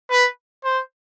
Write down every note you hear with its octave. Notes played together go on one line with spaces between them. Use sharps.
B4
C5